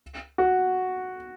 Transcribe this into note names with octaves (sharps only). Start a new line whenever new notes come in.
F#4